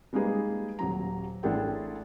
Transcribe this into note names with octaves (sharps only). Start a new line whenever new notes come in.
G3 G#3 A#3 D#4 G#4 B4
D#1 F#3 A#5
A1 D4 E4 G#4 A4 G5